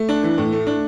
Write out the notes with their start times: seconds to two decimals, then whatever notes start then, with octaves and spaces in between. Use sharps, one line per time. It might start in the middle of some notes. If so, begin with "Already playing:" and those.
Already playing: A3
0.09 D4
0.23 E3
0.38 A2
0.52 A3
0.67 D4